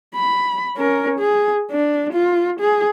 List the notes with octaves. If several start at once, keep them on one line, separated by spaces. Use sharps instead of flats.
B5
C#4 A#4
G#4
D4
F4
G#4